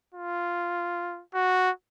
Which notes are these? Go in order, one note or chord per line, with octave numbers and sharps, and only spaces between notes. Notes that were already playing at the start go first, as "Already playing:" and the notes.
F4
F#4